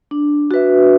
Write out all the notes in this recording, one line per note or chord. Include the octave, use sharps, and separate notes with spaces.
D4
F#4 B4 E5